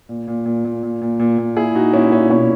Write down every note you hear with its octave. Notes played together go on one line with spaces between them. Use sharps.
A#2
A#2
A#2
A#2
A#2
A#2
A#2
A#2
A#2 E4 G#4
A#2 D#4 F#4
A#2 C#4 E4
A#2 C#4 E4
B2 C#4 E4